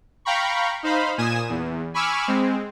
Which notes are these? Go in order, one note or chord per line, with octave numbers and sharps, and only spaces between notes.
F5 G5 A#5 B5 C#6
D#4 C5 F5 B5
A#2 G#5 D#6 E7
E2
G#5 B5 C#6 D6 E6 F6
G#3 C4